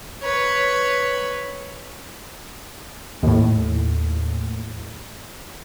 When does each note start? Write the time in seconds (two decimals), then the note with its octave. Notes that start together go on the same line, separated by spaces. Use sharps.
0.23 B4 C#5
3.23 D#2 A2